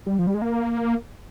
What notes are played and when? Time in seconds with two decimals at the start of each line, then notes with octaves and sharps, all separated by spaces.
0.06 G3
0.19 F3
0.27 G3
0.34 G#3
0.42 A#3